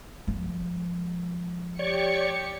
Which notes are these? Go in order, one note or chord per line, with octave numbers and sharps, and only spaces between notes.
F3 G#3
G4 C#5 D5 C#6 C#7